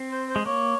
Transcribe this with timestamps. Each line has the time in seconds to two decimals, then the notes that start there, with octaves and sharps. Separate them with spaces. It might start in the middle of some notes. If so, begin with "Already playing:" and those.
Already playing: C4
0.11 C5
0.28 C5
0.36 G#3
0.46 A#3 C#5